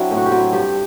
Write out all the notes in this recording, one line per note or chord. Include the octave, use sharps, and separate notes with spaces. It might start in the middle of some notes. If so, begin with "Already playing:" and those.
Already playing: F#3 C4 D4 E4
A2
F#4
G4
F#3 C4
E4
G2 G4